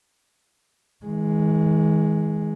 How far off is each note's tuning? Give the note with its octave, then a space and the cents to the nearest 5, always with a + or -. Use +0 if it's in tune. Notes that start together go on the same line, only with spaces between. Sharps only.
D#3 +45 G#3 +0